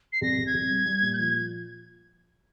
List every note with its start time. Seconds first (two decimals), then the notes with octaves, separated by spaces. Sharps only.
0.13 C7
0.21 C2 A#6
0.38 C2
0.47 G#6
0.54 C2
0.71 G3
0.86 G3
1.02 A#2
1.13 G6
1.18 F3 G#6